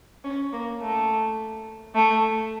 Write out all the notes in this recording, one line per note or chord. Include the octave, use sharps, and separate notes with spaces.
C#4
A#3
A3
A3